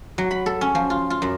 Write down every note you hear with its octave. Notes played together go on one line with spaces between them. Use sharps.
F#3
B5
A4
C#4
F3
F4
F4
F#2